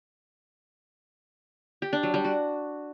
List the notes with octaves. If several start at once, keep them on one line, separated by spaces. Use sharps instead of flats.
G4
D4
F#3
G3
F#4